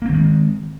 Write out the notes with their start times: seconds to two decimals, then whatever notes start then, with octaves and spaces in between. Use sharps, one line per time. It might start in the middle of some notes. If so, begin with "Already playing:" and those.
0.02 A#3
0.05 C4
0.09 D#3
0.13 G#3